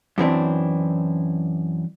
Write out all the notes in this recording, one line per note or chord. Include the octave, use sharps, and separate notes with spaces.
F#2 E3 C4 D4